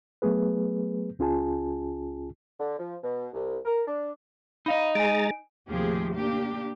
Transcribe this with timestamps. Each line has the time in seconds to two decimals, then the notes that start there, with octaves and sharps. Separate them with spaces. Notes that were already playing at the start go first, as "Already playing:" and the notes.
0.22 F#3 A3 B3 G#4 B4
1.19 C#2 C#4 F4 G#4 G#5 A5
2.60 D3
2.78 F3
3.03 B2
3.33 C2
3.65 A#4
3.86 D4
4.66 D#4 D#5 F5 B5
4.95 G#3 G#5 A#5 A6 D7
5.69 D#2 A2 C3 F3 G4 G#4
6.15 A#3 D4 G4